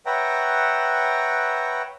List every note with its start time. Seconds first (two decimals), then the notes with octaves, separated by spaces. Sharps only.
0.06 B4 C#5 E5 F#5 G5 A#5